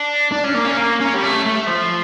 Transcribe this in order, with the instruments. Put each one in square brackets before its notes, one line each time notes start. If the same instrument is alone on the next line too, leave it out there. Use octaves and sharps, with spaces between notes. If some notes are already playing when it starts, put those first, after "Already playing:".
Already playing: [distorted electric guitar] D4
D4
C#4
A#3
C#4
A#3
C#4
G3
A3
A3
F3